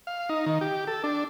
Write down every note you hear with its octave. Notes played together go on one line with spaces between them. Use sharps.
F5
D#4
D#3
G4
A4
D4